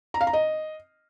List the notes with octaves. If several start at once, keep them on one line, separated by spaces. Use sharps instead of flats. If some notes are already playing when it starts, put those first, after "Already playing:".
A#5
F5
A#5
D#5